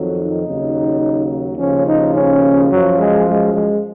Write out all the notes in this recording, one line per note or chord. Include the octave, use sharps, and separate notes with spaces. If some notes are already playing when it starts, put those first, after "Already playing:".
Already playing: F2 D#3 F#3
D#4
D#2 C#3 F#3
D#2 C#3 F3 C#4
D#4
C#4
F#2 F3 F#3
G#3
G#3
G#3